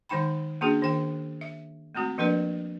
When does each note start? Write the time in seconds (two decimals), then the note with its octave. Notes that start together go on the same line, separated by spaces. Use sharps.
0.09 D#3 G#3 D#4 G5 B5
0.61 A#3 C#4 D4 F#4 G#4
0.82 D#3 A#4 G5
1.41 E5
1.95 G#3 A3 C4 F#4
2.18 F3 A#3 D4 A#4 B4 D5